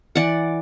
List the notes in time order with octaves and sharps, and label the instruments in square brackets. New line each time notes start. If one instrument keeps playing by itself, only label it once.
[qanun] E3 D5 F#5